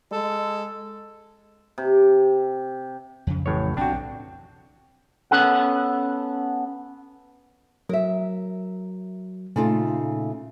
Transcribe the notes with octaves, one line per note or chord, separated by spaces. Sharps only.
G#3 A4
C3
F2 C#3
A1 A2 C#5
B1 B2 C4 D4 F#4 G5
B3 C#4 A4 F#5
F#3 A#4 E5
A#2 C#3 A3 D#4 F4